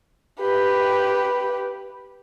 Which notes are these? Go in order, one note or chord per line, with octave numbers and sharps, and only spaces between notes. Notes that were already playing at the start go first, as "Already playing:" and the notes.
G4 B4